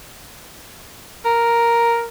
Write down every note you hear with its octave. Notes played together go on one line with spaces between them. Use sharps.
A#4